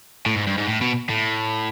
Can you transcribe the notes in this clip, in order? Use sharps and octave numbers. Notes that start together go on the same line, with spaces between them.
A2
G#2
G2
G#2
A2
B2
A2